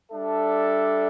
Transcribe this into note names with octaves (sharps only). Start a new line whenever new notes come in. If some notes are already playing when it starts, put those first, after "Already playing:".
G3 D4 A4 E5